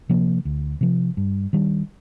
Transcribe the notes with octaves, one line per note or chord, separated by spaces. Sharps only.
C3 F3 A#3
D2
C3 F3
G2
D#3 G3 D4